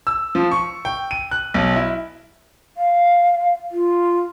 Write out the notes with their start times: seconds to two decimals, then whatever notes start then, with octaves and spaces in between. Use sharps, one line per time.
0.07 E6
0.35 F3
0.51 C#6
0.85 G5
1.11 D#7
1.31 F#6
1.54 B1
1.76 E4
2.77 F5
3.72 F4